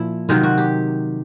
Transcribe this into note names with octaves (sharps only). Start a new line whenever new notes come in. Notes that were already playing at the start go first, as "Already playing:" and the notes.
Already playing: A#2 F3 E4
C3 D#3 F#3 F4
F#4
G4